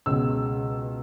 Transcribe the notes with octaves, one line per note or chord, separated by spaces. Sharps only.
C#2 B2 G#3 E6